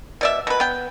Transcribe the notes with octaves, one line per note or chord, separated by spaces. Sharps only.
B2 D5 E5
B2 B4
B3 G5